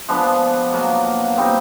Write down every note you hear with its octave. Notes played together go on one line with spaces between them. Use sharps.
F3 G#3 B3 D4
B2 F#3 A#3
A#2 G3 C4 D#4